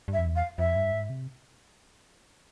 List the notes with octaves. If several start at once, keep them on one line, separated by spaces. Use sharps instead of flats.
G2 E5
F2
E2
F5
F2 E5
G2
G#2
C3